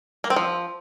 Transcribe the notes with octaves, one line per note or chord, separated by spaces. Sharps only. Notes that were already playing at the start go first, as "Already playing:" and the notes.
A#3
C4
F3